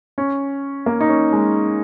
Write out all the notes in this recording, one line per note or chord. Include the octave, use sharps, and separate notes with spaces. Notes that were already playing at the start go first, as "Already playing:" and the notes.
C#4
A#3
D#4
C#4
G#3